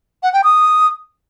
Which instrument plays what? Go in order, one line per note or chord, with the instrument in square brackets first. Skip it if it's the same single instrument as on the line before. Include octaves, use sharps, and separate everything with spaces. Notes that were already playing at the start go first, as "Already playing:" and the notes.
[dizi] F#5
G5
D#6